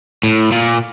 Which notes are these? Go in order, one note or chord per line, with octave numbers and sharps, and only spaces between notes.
A2
A#2